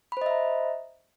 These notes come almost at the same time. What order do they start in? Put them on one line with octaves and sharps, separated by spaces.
B5 C5 D#5 E5 A#5